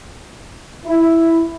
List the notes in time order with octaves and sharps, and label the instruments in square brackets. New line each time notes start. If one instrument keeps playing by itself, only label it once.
[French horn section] E4